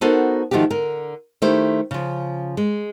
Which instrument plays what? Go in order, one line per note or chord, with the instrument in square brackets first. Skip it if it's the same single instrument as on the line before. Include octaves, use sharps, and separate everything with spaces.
[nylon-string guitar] B3 D#4 F#4 A4 A#4 C5
D#3 F3 A3 F#4 G4
D3 A#4
D#3 A3 E4 G4 C5
C#3 F3
G#3